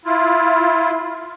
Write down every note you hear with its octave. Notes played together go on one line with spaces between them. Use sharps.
E4 F4